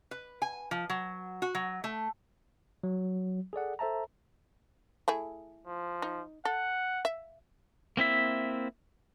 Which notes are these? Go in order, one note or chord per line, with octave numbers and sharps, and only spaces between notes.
B4
G#5
F3
F#3
F#4
F#3
A3
F#3
G#4 A4 D5 F#5
A4 C5 E5 A5 A#5
A3 E4 G#4
F3
D#4
A4 F#5
E5
A#3 C4 E4 E5